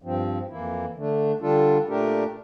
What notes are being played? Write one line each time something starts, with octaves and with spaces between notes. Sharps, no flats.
G2 F3 C4
F2 E3 A#3 E4
D3 A3 D4
D3 G3 D4 F4 A4
A#2 A3 D4 G4 A#4